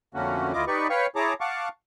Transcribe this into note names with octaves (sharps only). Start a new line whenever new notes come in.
F2 D3 A3 A#3 C#4 F#4
D2 E4 F4 D#5 D6
D#4 G4 B4 D5 C#6
B4 C#5 F5 G5 C#6
E4 G#4 C#5 A5 A#5 D6
F5 F#5 A5 C#6 D6